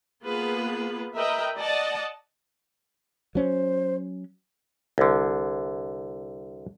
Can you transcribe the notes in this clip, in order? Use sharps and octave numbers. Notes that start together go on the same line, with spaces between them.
A#3 B3 F4 G#4 B4
A#4 B4 D#5 E5 G5
D5 D#5 F#5 A5
F#3 C#4 C5
C2 D3